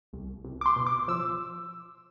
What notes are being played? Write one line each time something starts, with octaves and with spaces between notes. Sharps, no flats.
C2
C2
D6
C6
B2
D6
F3 E6